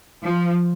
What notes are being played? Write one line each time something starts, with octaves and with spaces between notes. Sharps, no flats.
F3